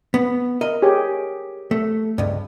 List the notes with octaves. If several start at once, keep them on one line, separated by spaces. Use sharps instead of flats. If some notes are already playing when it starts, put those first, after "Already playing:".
B3
A#4 D#5
G4 G#4 C#5
A3
C#2 G2